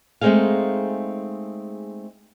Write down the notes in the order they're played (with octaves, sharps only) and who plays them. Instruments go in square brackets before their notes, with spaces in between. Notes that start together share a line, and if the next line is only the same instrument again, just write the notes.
[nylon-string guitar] G#3 A3 C4 D#4 G#4 F5